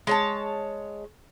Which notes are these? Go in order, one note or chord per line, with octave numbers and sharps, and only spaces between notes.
G#3 C#5 A5